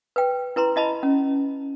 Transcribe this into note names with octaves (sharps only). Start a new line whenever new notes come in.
B4 G5
E4 B4 A#5 C6
E4 D#5 A5 B5
C#4